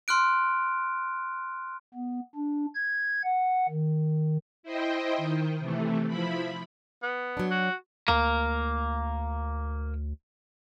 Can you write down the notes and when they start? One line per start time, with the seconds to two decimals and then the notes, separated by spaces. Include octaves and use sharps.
0.08 C6 F6 F#6 D7
1.94 B3
2.35 D4
2.75 G#6
3.24 F#5
3.69 D#3
4.63 E4 C5 D#5 G5
5.17 D#3
5.59 C3 E3 A3
6.08 F3 E4 B5
7.03 B3
7.37 F#3 D4
7.51 F#4
8.08 D2 A#3